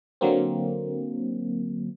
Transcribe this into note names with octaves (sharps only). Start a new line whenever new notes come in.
D3 F#3 A#3 C4